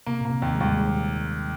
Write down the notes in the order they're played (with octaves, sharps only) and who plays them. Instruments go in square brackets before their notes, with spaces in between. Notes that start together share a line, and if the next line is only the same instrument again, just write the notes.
[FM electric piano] C3 [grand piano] A#3
[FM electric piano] A#2 [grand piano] A#3
[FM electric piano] C3
[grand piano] D#2
[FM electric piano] G#3
[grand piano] D#2 [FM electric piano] G3
[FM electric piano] G#3